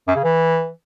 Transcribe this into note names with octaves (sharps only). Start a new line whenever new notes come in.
F#2
C#3
E3